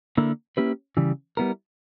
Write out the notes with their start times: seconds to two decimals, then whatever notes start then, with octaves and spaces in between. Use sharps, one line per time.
0.17 D3 A#3 E4 A#4
0.57 A#3 C#4 E4 G4 B4
0.97 C#3 E3 G3
1.37 G3 B3 E4 A#4